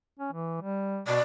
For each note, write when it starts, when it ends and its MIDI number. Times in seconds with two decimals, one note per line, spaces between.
0.19 0.31 61
0.32 0.58 52
0.61 1.01 55
1.07 1.20 47
1.07 1.22 74